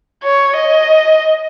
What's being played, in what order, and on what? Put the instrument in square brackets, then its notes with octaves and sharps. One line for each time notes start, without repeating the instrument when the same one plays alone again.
[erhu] C#5
D#5